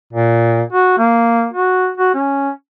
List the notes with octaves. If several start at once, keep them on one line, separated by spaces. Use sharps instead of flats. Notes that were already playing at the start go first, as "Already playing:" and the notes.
A#2
F#4
A#3
F#4
F#4
C#4